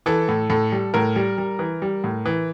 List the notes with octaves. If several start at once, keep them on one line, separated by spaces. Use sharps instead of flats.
E3 A4
A2
A2 A4
G3
A2 A#4
G3
G3
E3
G3
A2
E3